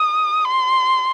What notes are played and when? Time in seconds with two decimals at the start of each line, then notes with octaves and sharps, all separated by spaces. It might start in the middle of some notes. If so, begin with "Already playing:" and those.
Already playing: D#6
0.45 C6